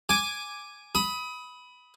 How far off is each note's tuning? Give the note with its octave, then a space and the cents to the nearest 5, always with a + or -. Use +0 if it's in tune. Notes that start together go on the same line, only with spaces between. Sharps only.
G#5 +0 D6 +0
B5 +0 D#6 +30